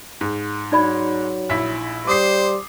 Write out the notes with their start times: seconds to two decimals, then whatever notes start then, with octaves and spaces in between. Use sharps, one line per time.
0.21 G#2
0.72 F#3 D#4 D5 B5
1.49 A#1 E4 B6
2.07 G3 C5 D6 D#6 C7